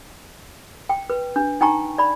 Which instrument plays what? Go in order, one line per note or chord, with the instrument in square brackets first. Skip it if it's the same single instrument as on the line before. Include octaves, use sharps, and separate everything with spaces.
[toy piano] G5
B4
D4
D#4 G5 G#5 A#5 C#6
D5 B5